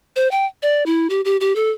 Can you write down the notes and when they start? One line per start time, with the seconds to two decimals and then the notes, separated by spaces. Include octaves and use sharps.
0.16 C5
0.31 G5
0.62 D5
0.86 E4
1.10 G4
1.25 G4
1.41 G4
1.56 A4